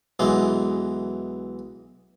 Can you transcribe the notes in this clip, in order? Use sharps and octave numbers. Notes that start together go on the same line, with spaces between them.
B1 E3 G#3